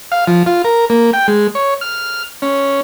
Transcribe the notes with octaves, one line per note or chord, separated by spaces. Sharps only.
F5
F3
F4
A#4
A#3
G5
G#3
C#5
F6
C#4